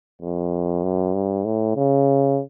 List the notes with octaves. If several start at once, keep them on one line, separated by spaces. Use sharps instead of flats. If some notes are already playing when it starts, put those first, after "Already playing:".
F2
F#2
G2
A2
C#3